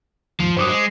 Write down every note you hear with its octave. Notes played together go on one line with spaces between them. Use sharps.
D#2 G#2 F3
G2 F#3 C5 D6 D#6
G#3